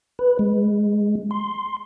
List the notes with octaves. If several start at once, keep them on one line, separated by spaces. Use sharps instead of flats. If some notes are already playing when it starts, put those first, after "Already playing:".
B4
G#3
C6